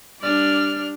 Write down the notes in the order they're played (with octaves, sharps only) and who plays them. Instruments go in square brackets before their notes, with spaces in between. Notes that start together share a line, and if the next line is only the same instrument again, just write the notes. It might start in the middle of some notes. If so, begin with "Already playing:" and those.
[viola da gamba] G3 D4 [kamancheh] D5 F6